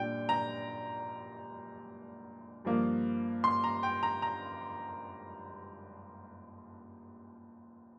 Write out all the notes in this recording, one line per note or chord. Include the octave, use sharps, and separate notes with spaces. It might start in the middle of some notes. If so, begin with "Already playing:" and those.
Already playing: A#2 G3 D4 G5
A#5
G2 F3 A#3
C6
A#5
G5
A#5
A#5